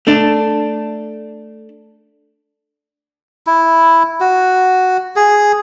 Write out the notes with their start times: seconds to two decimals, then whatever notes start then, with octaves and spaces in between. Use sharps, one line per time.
0.07 A3 D4
3.47 E4
4.20 F#4
5.16 G#4